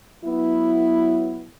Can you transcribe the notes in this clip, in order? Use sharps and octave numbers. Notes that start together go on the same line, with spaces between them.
F#3 B3 E4